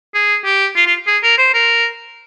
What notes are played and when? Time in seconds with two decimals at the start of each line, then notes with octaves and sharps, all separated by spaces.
0.14 G#4
0.45 G4
0.76 F4
0.87 F4
1.07 G#4
1.23 A#4
1.38 C5
1.54 A#4